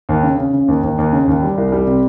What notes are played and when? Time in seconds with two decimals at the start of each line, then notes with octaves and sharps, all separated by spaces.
0.09 D#2
0.23 C#3
0.38 C#3
0.53 C#3
0.68 D#2
0.83 D#2
0.98 D#2
1.12 C#3
1.27 D#2
1.42 G3
1.58 C2
1.72 G3
1.87 C3